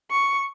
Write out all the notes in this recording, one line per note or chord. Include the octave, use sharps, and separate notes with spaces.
C#6